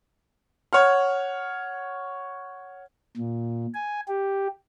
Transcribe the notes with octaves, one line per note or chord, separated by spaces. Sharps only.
C#5 F#5 F6
A#2
G#5
G4